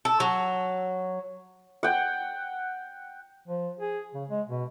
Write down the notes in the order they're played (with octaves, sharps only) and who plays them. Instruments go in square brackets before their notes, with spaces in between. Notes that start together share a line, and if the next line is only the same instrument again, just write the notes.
[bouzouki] A4
F#3
[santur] F#5 G5
[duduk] F3
G#4
C#3
G#3
B2